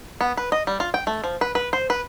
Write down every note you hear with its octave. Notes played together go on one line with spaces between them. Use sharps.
B3
B4
D#5
G3
F4
G5
A3
F3
B4
B4
C5
B4